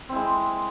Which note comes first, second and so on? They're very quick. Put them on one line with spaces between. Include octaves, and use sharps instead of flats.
C4 E4 G#3